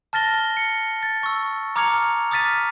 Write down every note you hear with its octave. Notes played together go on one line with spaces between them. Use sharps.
A5 F6 A6 A#6 G7
C#7
A6
C#6 E6
A#5 D6 F6 G#6 C#7 F7
D6 D#6 F6 A6 B6 D#7